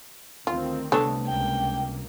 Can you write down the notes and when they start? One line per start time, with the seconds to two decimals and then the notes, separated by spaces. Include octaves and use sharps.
0.47 D2 D#3 C4 F4
0.92 C2 A3 B3 D4 A4 C#5 A5
1.27 C#2 A#3 G5